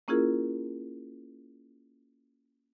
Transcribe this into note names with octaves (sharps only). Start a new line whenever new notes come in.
A#3 C#4 E4 F4 G#4 A#4